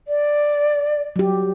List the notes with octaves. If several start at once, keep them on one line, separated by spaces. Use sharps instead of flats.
D5
F#3 G4